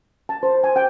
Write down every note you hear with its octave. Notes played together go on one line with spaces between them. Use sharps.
A5
C5
G#5
G5